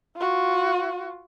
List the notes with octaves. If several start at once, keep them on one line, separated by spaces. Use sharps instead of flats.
F4 F#4